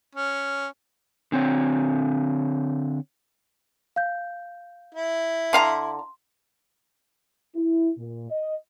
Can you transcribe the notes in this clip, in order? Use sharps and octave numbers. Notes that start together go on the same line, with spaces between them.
C#4
D3 C4 C#5
F5 G6
E4
D3 F5 A#5 C6
E4
A#2
D#5